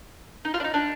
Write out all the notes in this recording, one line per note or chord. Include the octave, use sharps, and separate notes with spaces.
D#4
F4
D4
D#4
D4